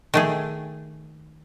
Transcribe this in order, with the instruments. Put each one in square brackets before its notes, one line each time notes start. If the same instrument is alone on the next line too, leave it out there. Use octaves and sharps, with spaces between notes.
[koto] D#3 A3 G#4